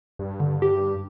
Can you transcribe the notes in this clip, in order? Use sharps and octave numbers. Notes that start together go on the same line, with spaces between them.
G2
D3
G4